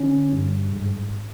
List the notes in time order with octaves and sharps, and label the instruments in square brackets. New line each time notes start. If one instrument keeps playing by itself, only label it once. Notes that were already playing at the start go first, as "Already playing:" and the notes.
Already playing: [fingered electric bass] D3 C#4
G2
G#2